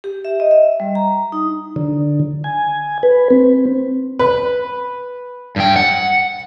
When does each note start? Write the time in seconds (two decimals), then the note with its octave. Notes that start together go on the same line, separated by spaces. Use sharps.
0.04 G4
0.25 E5
0.40 D#5
0.51 E5
0.80 G3
0.95 A#5
1.32 D#4
1.76 D3
2.44 G#5
3.03 B4
3.30 C4
4.19 B4
5.56 G2 G5
5.76 F#5